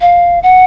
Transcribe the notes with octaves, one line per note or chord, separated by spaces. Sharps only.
F5
F#5